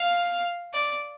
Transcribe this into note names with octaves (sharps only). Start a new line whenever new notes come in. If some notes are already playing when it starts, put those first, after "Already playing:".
Already playing: F5
D5